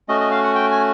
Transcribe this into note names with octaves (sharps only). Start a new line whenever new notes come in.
A3 C#4 F#4 D#5
D#5
F5
F#5
G5
G#5